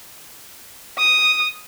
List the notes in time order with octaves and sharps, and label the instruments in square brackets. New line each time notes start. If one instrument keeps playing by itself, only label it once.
[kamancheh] D#6